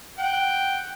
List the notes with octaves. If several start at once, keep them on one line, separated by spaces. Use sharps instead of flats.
F#5 G5